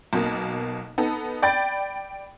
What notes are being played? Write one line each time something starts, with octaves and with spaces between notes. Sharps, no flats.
B1 B2 A#3
B3 D#4 A4
D5 G5 B5 A6